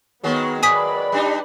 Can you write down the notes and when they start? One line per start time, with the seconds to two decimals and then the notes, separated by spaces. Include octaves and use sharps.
0.24 D#3 F#3 G#3 B3
0.63 B4 D5 G#5 B5 D#6 B6
1.12 G3 D4 D#4